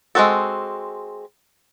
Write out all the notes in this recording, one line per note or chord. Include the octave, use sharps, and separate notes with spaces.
G#3 A3 C4 F#4 A4